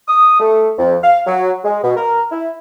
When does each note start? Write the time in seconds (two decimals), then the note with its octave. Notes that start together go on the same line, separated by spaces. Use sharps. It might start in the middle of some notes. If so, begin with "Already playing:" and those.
0.08 D#6
0.40 A3
0.78 F2
1.03 F5
1.27 F#3
1.64 G#3
1.83 B2
1.97 A#4
2.31 E4